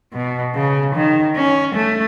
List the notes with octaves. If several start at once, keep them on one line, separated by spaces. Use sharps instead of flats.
B2
C#3
D#3
C#4
A3